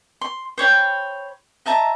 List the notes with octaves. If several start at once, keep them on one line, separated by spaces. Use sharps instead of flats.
C6
C5 C#5 G5 B5
D#5 E5 A5 A#5